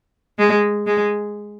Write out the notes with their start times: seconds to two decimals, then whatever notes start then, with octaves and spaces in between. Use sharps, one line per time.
0.39 G#3
0.86 G#3